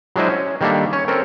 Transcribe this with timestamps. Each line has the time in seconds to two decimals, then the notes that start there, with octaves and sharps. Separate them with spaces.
0.16 F#3 G#3 D4 E4 C5 D#5
0.29 C#4
0.61 D#3 G3 A#3 D4 A4 E5
0.93 C#4 C#5
1.08 C4 C#4 A4 A#4